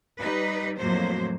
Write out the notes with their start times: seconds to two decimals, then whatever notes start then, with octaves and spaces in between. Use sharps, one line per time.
0.19 G3 D#4 B4
0.79 F2 A2 F#3 A#3 C5